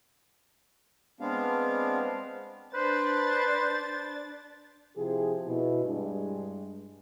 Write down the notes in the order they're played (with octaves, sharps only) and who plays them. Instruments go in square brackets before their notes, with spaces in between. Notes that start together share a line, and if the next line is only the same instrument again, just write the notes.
[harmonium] G#3 B3 C4 D4 F5
[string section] D4 A6 [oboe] B4 [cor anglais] C5
[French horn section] C3 F3 E4 G4 G#4
B2 E4
G2 G#3